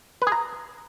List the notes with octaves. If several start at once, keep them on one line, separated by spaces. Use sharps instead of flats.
B4
G#4
A#5